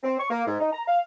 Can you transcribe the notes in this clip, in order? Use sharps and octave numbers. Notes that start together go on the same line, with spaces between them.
C4
C#6
A#3
G#2
D#4
A#5
F5